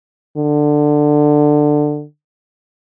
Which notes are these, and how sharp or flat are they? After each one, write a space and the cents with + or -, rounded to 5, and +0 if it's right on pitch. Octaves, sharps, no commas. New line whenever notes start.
D3 +15